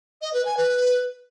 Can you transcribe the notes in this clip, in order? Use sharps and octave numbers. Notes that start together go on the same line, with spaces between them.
D#5
B4
G#5
B4